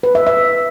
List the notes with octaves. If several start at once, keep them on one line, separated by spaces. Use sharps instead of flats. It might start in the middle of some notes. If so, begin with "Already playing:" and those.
B4
E5
E5